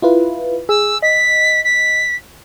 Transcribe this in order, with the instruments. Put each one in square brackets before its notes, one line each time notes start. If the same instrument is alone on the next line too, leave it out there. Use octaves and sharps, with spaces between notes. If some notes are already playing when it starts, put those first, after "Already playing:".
[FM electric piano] E4 F4 B4
[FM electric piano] G#4 [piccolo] E6
[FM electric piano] D#5 [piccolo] B6
[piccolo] B6